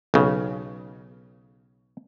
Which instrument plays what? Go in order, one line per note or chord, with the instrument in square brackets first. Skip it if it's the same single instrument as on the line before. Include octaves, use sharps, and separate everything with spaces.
[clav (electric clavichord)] B1 C#3